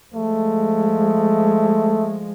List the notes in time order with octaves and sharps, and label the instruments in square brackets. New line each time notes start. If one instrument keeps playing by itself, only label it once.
[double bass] F3 G#3 [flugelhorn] A3